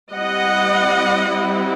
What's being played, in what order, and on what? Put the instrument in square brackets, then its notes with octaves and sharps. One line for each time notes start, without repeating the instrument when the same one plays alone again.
[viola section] G3 C4 E4 D#5 F#5